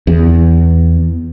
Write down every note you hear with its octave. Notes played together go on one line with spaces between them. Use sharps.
E2